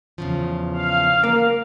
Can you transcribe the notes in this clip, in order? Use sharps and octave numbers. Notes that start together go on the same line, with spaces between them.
E2 C#3 F3
F5
A#3